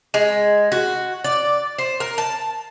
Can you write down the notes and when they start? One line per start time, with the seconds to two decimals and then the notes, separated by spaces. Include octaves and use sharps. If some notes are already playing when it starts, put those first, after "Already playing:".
0.14 G#3
0.72 F#4
1.24 D5
1.78 C5
2.00 A#4
2.18 A5